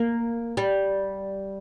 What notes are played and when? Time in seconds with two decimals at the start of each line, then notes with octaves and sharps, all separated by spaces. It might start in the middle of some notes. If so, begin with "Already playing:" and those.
Already playing: A#3
0.57 G3